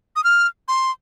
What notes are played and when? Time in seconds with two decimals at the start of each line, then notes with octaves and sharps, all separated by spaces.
0.16 D#6
0.24 F6
0.68 C6